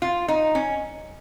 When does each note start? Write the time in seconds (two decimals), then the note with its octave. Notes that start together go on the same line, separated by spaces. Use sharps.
0.02 F4
0.28 D#4
0.55 C#4